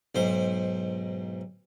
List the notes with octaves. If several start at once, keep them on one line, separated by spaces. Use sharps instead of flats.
B1 G#2 C5